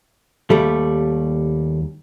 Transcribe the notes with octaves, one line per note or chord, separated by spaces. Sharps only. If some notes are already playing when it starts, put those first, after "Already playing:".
D#2 G3 A3